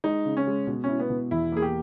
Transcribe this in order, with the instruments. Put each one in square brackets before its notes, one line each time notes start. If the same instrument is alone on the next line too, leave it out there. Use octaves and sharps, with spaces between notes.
[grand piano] G#3 [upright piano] D#4
[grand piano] C#3
[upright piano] C#4
[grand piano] G#3
B2
[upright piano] C#4 [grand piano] E4
[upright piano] B3
[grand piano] B2
[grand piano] E2 [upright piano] E4
[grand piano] A#3 [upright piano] G#4
[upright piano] G4